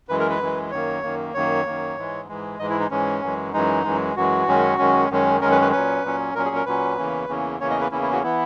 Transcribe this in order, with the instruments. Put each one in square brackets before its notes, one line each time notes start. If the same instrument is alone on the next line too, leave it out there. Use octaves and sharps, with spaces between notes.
[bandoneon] F#2 E3 G#3 B4
A#4
B4
F#2 E3 G#3
F#2 D#3 A#3 C#5
F#2 D#3 A#3
F#2 D#3 A#3 C#5
F#2 D#3 A#3
G#2 E3 G#3
G#2 E3 G#3
G#2 E3 G#3 D#5
E4
D#4
G#2 E3 G#3 C#4
F#2 E3 G#3
F#2 E3 G#3 D#4
F#2 E3 G#3
F#2 E3 G#3 F#4
F#2 D#3 G#3 C#4
F#2 D#3 G#3 C#4
F#2 D#3 G#3 C#4
F#2 D#3 G#3 C#4 A#4
B4
B4
A#2 F#3 C#4 B4
A#2 F#3 C#4
A#2 F#3 C#4 A#4
G#4
A#4
A#2 F#3 C#4 B4
E2 C#3 E3 A#3 C#4
E2 C#3 E3 A#3 C#4
E2 C#3 E3 A#3 C#4 C#5
D#5
B4
E2 C#3 E3 A#3 C#4 E4
E4
F#4
E3 B3 E4